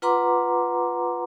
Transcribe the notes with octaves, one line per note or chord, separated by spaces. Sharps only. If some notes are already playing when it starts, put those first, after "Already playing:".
F4 B4 F#5 A#5 C6 D6